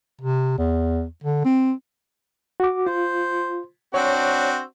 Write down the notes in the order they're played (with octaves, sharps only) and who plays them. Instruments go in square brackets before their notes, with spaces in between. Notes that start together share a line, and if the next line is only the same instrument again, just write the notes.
[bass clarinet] C3
E2
D3
C4
[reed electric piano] F#4 D6
[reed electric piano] F4 [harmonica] C5
[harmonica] C4 D4 F#4 [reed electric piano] C#5